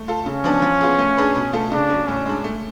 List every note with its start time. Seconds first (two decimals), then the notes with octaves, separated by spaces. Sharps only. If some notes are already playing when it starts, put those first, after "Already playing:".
Already playing: A3
0.08 F4 A4
0.26 C#3 C#4
0.44 F3 B3 D4
0.62 F3
0.81 B3 F4 G#4
0.99 A3
1.17 D4 G#4 B4
1.35 B2
1.53 A3 F4 A4
1.72 C#3 D4
1.90 F#3 C#4
2.07 A2 C#4
2.26 G#3 D4
2.44 A3